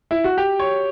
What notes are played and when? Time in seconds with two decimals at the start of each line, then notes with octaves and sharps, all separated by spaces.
0.11 E4
0.24 F#4
0.37 G4
0.59 C#5